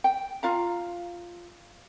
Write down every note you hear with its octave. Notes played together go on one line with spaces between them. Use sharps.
G5
F4 F5 A#5